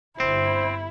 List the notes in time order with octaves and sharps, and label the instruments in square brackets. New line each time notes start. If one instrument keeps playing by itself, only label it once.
[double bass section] G1 [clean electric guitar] C4 [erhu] E4 [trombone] C5